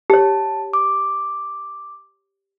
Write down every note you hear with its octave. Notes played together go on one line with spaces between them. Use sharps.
G4 C#5 A5
D6